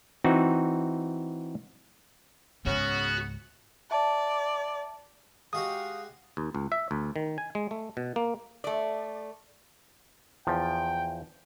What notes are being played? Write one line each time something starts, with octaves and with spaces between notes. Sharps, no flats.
E3 C4 D#4 F#4
C#2 G#2 C#3 B3 C#4 F#4
D5 E5 A5
G#3 F#4 G4 F5 D#6
D#2
C#2
E5
D2
D#3
G#5
G#3
A3
B2
A#3
A3 D5
E2 F3 G5